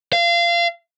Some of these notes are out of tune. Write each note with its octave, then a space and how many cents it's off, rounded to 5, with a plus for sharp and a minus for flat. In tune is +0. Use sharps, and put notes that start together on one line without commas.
F5 -25